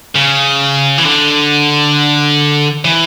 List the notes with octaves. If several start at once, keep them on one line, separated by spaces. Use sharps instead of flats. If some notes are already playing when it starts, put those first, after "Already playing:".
C#3
E3
D3
E3